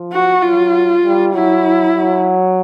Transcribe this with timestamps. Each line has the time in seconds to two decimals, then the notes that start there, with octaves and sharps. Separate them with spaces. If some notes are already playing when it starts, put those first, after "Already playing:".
Already playing: F3
0.12 F#4
0.42 F#3 F4
1.04 G3
1.34 F#3 E4
1.95 F#3